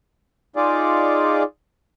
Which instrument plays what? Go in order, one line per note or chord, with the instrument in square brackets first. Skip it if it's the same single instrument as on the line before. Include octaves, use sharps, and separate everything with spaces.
[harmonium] D#4 F4 G#4 D5